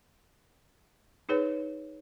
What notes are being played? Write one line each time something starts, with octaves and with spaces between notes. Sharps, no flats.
D#4 G#4 B4 C#5